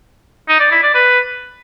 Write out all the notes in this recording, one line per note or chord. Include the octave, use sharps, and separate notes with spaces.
D#4
D5
E4
D5
B4